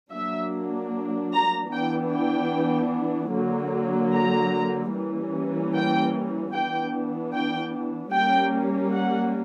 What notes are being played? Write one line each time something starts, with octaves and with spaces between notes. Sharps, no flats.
F#3 A#3 D4 E5
A#5
E3 B3 D4 G5
G5
D3 F#3 A#3
A#5
E3 G3 A#3 C#4
G5
E3 B3 D4 G5
G5
G3 A#3 C#4 G5
F#5